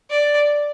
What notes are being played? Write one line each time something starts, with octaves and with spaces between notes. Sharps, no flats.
D5